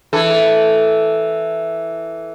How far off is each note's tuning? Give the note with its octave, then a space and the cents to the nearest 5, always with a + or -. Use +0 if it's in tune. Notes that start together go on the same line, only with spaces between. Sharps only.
E3 +0 A4 +0